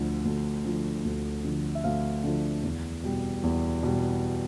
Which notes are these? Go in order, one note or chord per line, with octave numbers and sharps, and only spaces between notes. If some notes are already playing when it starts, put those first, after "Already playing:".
Already playing: D2 D3 F3
D2
D3 F3
D2
D3 F3
E5
D2 F5
D3 F3
E2
B2 G3
E2
B2 G3